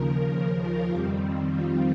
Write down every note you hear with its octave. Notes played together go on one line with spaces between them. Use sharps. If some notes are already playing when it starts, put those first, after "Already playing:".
Already playing: D#2 C#3 F3 A#4
F4
F2 D#3 G3 C4 G4
F4